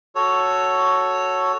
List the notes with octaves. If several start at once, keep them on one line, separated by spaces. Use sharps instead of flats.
F#4 A4 C#5